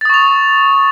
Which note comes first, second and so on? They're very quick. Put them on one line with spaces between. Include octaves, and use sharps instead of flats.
A6 D#6 C#6 F7